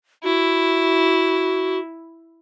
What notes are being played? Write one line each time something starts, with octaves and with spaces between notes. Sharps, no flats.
E4 F#4